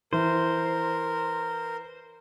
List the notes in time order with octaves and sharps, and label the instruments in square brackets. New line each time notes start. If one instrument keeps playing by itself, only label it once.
[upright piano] E3 [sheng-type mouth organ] A#4 [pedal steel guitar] C5